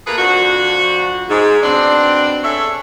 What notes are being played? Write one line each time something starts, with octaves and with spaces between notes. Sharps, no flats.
A3 A#3 F4 G#4 A#4 B4
F2 F3 D4 F#4
G#2
B2 C4 D4
D4 G#4 A4 C#5 E5